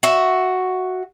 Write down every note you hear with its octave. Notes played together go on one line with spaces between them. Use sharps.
F#4 E5